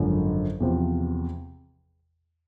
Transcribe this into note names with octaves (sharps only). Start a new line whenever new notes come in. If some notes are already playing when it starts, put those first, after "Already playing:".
Already playing: G#1 F#2 D3 F3
E2 C3 F3